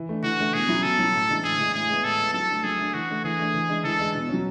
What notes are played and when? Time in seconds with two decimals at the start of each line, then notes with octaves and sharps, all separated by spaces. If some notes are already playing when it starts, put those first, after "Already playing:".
Already playing: E3
0.09 A3 D4
0.23 E3 F#4
0.39 A3 D4
0.53 B2 G#4
0.68 F#3 C#4 E4
0.83 B2 A4
0.99 F#3 C#4 E4
1.14 A2
1.29 E3 G#3 D4
1.44 A2 G#4
1.59 E3 G#3 D4
1.74 A2 G#4
1.89 G#3 B3
2.04 A2 A4
2.19 G#3 B3
2.34 F#3 A4
2.49 A3 D4
2.64 F#3 G#4
2.79 A3 D4
2.94 E3 F#4
3.09 A3 D4
3.24 E3 G#4
3.39 A3 D4
3.55 E3
3.69 G#3 D4
3.84 E3 A4
3.99 G#3 D4
4.15 B2
4.29 F#3 C#4